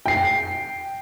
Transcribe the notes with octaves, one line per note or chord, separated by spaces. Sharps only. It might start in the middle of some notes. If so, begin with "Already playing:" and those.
G5 C7